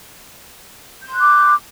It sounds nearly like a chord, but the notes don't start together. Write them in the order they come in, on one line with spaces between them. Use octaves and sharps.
G6 C6 F#6 D6